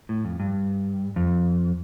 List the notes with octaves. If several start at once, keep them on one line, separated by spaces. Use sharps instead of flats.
A2
F2
G2
F2